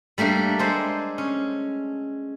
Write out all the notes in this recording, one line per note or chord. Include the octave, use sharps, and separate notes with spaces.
G3 A3 A#3 D4
G#3 A4 C5
C#4